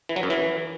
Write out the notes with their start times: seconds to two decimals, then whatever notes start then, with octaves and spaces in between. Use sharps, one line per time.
0.09 E3
0.16 F#3
0.23 F#2
0.30 E3